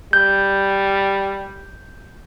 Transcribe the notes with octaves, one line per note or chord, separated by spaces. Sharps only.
G3 G6